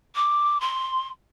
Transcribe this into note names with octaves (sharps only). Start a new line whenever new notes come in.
D6
C6